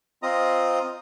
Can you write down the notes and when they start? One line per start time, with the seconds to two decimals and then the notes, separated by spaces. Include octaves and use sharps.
0.23 C4 F4 D#5 A#5 D#6